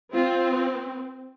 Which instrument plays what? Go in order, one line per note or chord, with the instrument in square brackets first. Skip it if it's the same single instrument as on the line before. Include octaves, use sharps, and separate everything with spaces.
[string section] C4 [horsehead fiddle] F4